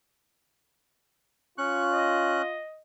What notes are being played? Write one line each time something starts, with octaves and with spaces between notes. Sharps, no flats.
C#4 F4 C#6 F#6
D#5